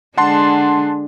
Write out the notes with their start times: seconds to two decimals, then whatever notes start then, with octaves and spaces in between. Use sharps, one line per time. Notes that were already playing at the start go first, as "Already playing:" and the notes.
0.18 D3 G#3 D4 F#5 A5 C6